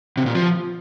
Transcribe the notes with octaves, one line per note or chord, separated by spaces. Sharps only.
C3
A#2
F3